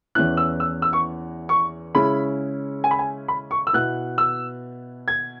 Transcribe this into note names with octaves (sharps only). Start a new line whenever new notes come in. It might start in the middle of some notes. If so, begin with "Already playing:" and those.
E2 E3 C#4 E4 F#6
E6
E6
E6
C#6
C#6
C#3 G#3 C#4 E4 B5
G#5
B5
G#5
B5
C#6
E6
B2 B3 E4 F#6
E6
G#6